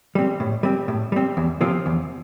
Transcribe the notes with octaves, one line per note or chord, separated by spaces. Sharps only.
G3 C4
A2
G3 C4
A2
G3 C4
E2
C3 F3 C4
E2